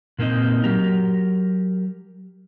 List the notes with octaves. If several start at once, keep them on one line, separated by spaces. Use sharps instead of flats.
A#2 A#3 C4 D#4 D#5
F#3 G4 A#4